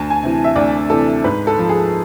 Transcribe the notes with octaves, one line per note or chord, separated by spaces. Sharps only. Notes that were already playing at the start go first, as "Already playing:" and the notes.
Already playing: D2 A5
G#5
C3 E3
E5
D2 D5
C3 E3 A4
G#2 B4
A4
F3
G#4